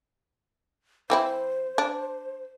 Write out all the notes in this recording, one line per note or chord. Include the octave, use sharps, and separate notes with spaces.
E3 C4 E4 C5
D4